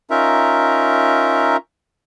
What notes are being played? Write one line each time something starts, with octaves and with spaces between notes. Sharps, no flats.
C#4 D#4 F4 A#4 E5